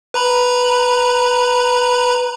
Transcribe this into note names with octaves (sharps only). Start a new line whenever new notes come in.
B4 A#5 B5